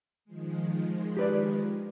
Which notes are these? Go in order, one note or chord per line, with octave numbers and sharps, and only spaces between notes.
D#3 F3 G#3
G4 B4 D5